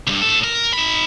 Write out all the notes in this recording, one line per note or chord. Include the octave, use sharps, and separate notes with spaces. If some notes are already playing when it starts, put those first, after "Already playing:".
C#2 G2
A2 A4
A#4
D#4 B5